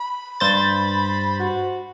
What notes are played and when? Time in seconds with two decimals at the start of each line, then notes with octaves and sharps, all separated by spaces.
0.01 B5
0.40 G2 C5 A6
1.40 F#4